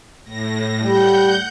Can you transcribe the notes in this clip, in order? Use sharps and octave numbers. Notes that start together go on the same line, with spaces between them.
A2 A#6
G3 F#5 G6